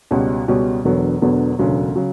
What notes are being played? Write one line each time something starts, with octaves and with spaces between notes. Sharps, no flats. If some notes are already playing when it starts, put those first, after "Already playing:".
C#2 B2 G3 C#4 F#4
C#2 B2 G3 C#4 F#4
E1 E2 D3 F#3 B3
E1 E2 D3 F#3 B3
E1 D2 C#3 F#3
C#3 F#3